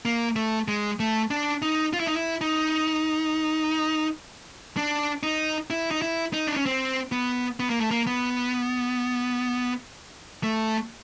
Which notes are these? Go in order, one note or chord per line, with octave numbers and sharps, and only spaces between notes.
A#3
A3
G#3
A3
D4
D#4
F4
E4
D#4
E4
D#4
D4
D#4
E4
D#4
E4
D#4
D4
C#4
C4
B3
B3
A#3
A3
A#3
B3
A3